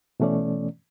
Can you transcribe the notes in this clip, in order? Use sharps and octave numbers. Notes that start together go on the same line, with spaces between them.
B2 E3 A3 C#4 D5